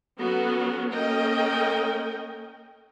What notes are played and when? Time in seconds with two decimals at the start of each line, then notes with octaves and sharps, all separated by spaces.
0.20 F#3 B3 C#4 F#4 A4
0.92 A#3 C#4 A4 A#4 D#5 G5